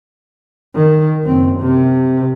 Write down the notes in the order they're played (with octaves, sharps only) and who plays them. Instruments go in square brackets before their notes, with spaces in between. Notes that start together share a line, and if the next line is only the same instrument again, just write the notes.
[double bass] D#3
F#1 C4
C3